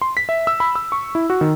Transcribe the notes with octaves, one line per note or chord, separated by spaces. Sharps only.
C6
B6
E5
E6
B5
E6
C#6
E4
F#4
D#3